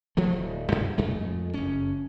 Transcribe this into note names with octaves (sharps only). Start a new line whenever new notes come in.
F3 F#3 A3
D1
F#2 G#3
F2 G#3 A3
F#1 C#4